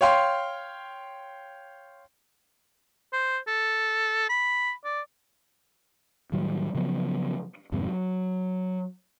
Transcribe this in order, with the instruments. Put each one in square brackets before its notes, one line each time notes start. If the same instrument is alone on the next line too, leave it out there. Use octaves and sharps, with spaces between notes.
[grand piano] C#5 F5 G5 C6
[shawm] C5
A4
B5
D5
[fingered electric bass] A2 D#3 F#3 G3
C#3 F3 F#3 B3
F2 G#2 C3 D#3
F#3